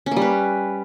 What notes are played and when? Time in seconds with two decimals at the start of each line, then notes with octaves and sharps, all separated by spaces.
0.06 C#4
0.11 A#3
0.16 G3
0.22 B4